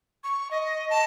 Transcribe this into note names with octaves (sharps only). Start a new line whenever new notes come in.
C#6
D#5
A5